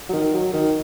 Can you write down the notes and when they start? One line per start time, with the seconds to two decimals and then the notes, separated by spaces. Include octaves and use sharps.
0.09 F#3
0.13 D#3
0.34 F#3
0.53 D#3